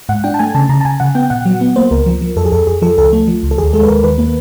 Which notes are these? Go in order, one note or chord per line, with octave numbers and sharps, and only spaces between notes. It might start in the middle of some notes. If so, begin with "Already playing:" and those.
G#2 F#5
D4 G5
A5
A3 G#5
C#3 A5
C#3 A#5
A5
C#3 G#5
C#3 F#5
B3 G5
A#2 F#5
F#3
B3
A#3 C5
C#2 A#4
F3
F3
F2 A4
G#4
F2 A4
F2 G#4
F3 A4
C#2 A4
A3
F3
C#2
A4
D#2 G#4
G#3 A4
B4
D#2 A#4
D#3 B4
A#3